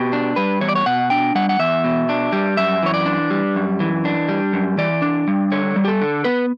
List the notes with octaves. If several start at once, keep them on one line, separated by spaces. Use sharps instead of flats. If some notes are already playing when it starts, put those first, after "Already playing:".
Already playing: B2 G4
D4
G3 B4
E2 C#5
D5
C#5
B2 F#5
D4 G5
G3 F#5
F#5
E2 E5
B2
D4
G3
F#2 E5
E3 C#5
D5
D4
G3
F#2
E3
D4
G3
F#2
E3 D5
D4
G3
D3 C#5
G3
G4
A4
D3
B3 B4